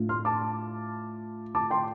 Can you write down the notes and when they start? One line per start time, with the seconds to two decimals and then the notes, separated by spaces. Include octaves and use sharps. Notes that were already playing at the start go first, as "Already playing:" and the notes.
Already playing: A2 A3 D4 F4
0.09 C6 F6
0.25 A5 D6
1.55 A5 D6
1.71 G5 C6